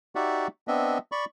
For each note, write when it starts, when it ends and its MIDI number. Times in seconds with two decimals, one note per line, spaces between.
0.15 0.47 63
0.15 0.47 66
0.15 0.47 67
0.15 0.47 74
0.15 0.47 76
0.15 0.47 78
0.68 0.98 59
0.68 0.98 60
0.68 0.98 62
0.68 0.98 75
0.68 0.98 76
1.12 1.25 74
1.12 1.25 83
1.12 1.25 85